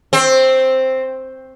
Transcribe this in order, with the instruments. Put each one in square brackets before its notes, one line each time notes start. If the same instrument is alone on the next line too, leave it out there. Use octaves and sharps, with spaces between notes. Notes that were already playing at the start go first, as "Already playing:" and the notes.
[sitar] C4